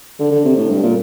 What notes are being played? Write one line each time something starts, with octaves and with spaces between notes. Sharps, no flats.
D3
D3
C3
A2
G2
A#2